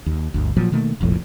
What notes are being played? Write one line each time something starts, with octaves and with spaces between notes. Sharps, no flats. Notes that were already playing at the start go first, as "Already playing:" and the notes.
D#2
G1 D2
A#2 F3 F#3
B2 D#3 A3 A#3
F1 A#1 F2 A2